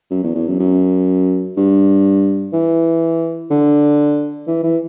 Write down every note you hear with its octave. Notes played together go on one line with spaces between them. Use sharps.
F#2
E2
E2
F#2
F#2
G2
E3
D3
E3
E3